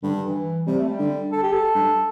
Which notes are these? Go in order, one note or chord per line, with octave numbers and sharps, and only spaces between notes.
G2 D3
E3
C3 G3
A3
G3
D3
A4
G4
A4
G2